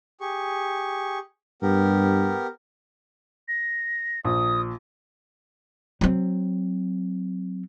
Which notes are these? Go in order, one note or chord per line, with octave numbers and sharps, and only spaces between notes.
G4 G#4 C#6
G2 B3 G4 A#4
A#6
A#1 D#6
F#3 C4